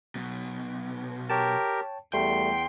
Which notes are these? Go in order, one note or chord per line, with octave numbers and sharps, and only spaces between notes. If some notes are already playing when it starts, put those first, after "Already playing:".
B1 B2
G4 A#4 C#5 G5 A5
E2 G3 A3 G5 C6